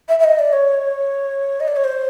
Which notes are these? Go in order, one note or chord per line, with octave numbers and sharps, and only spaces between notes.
E5
E5
D#5
D5
C#5
D#5
D5
C#5
C5